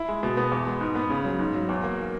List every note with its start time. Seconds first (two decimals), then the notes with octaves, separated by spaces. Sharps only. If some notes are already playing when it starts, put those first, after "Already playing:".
Already playing: E4
0.08 G#3
0.23 B2
0.37 B3
0.52 E2
0.67 G#3
0.81 G#2
0.95 B3
1.10 C#3
1.25 F#3
1.39 G#2
1.54 F#3
1.69 E2
1.84 A#3